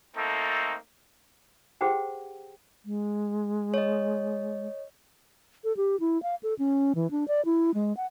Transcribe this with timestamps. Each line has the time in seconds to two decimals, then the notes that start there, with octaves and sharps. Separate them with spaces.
0.16 A3 A#3 C4 D#4 A4
1.81 G4 G#4 B4 C5 F#5 G5
2.85 G#3
3.74 C#5 D#5
5.64 A4
5.77 G4
6.00 E4
6.23 F5
6.43 A4
6.59 C#4
6.95 E3
7.11 D4
7.28 D5
7.45 E4
7.74 G#3
7.97 F#5